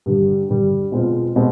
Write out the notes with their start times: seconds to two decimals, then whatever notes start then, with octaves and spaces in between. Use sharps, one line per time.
0.06 G2 D3 G3
0.49 G2 D3 G3
0.92 B2 G#3 C4 F4
1.36 B2 G#3 C4